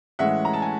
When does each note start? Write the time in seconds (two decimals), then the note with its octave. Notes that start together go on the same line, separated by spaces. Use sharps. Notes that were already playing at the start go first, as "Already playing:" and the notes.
0.19 A2 E3 G#3 C#4 E5 F#5
0.45 A#5
0.53 A5
0.62 G#5